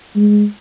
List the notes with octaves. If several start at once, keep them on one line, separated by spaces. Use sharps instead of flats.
G#3